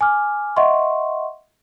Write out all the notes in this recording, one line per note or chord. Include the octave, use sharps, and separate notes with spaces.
G#5 D6 F6
D#5 E5 F#5 C6 C#6